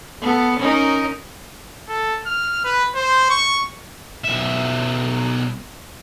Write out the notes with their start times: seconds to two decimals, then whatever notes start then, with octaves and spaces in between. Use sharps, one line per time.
0.22 B3 A4
0.60 C#4 D#4 A#4
1.88 A4
2.26 F6
2.64 B4
2.95 C5
3.30 C#6
4.25 B1 E5